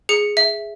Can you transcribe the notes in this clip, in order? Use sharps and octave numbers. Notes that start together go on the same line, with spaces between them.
G#4 C#7
E5